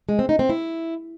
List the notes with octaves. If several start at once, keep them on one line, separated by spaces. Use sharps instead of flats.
G#3
C4
D#4
C4
E4